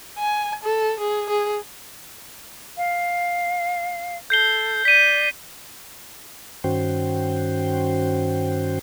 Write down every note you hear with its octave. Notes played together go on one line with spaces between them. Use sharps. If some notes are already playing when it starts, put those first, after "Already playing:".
G#5
A4
G#4
G#4
F5
A4 G6 C7 G7
D5 B6 D#7
G2 D#3 C#4 F#4 C5 G5